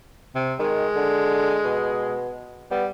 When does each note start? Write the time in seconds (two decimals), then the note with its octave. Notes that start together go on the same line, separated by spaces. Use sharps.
0.35 C3
0.59 D#3 G#3
0.95 D3
1.65 B2
2.71 G3 B3